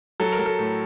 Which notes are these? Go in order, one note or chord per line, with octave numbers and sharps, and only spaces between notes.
F#3 A4
A#4
F#3
A4
A2